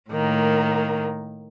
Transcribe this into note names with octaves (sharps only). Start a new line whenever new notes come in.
A2 D#3 A#3